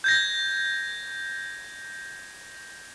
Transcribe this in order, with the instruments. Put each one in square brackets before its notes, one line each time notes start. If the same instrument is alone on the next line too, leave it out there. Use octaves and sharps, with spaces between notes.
[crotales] G6 G#6 A#6